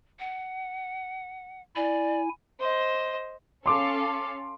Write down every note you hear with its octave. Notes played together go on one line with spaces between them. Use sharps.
F#5
E4 D5 G#5
C5 D#5
C#4 A4 F5 C6 D6